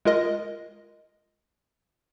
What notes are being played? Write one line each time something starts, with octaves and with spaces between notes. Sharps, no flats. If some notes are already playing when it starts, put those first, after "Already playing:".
G#3 F4 A#4 D#5